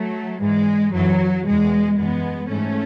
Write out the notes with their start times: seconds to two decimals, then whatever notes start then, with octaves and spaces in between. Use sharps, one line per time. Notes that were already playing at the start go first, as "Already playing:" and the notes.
Already playing: F#3 A3
0.41 G#2 E3 G#3
0.93 F#2 E3 F#3
1.45 E2 B2 G#3
1.98 F#2 E3 G#3 B3
2.50 G#2 E3 A3 C#4